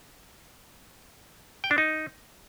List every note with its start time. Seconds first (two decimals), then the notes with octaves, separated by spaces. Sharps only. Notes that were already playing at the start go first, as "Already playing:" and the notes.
1.64 G5
1.71 D4
1.78 D#4